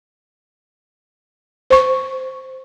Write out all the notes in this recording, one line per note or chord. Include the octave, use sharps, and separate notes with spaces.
C5 C#6